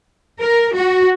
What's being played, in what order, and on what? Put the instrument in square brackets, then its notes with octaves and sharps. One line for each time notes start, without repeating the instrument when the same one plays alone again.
[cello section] A#4
F#4